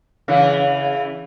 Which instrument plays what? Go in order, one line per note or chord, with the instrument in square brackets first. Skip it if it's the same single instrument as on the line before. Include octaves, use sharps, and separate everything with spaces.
[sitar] C#3 E3